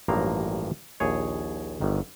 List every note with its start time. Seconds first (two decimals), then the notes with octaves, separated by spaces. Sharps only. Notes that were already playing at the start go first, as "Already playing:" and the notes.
0.08 A1 G2 F3 F#3 A#3 A#5
1.00 A#1 D#2 G#4 C#5
1.81 G1 D#3